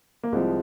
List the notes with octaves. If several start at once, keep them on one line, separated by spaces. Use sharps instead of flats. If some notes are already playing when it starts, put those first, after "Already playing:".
A#3
C2 C3 F3 G#3